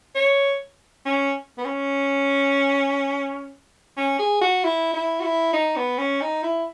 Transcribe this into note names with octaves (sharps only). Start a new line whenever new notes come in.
C#5
C#4
B3
C#4
C#4
G#4
F#4
E4
E4
F#4
E4
D#4
B3
C#4
D#4
E4